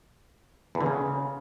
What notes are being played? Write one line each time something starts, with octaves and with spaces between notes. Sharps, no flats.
E2
D3
C#3